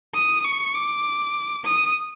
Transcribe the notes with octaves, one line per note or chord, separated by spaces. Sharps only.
D#6
C#6
D6
D#6